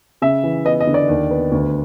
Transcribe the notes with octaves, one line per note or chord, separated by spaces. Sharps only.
C#3 E5
E3
B3 D#5
D#5
D3
D5
D#2
B3
D2